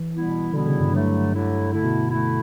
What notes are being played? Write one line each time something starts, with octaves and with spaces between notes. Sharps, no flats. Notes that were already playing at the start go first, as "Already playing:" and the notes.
Already playing: E3
B2 G3 B3 E4
B2 D3 G3 B3 E4
C#3
G2
G2 D3 F#3 A3 E4
D3 F#3 A3 E4
D3 A3 E4
B2
D3 A3 E4